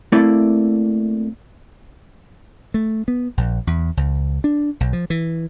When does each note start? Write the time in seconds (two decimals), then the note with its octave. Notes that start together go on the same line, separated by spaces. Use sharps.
0.12 A3 A#3 C4 E4 D5
2.74 A3
3.08 B3
3.37 A#1
3.67 E2
3.97 C#2
4.44 D4
4.80 B1
4.93 F3
5.10 E3